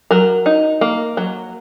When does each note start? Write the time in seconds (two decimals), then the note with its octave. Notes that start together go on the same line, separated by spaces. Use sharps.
0.11 F#3 A#4
0.46 D#4
0.81 A#3
1.17 F#3